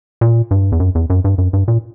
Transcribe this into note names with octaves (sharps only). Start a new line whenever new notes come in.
A#2
G2
E2
F#2
E2
F#2
G2
F#2
G2
A#2